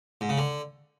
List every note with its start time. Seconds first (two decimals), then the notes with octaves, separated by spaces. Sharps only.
0.21 G#2
0.29 C#3
0.38 D3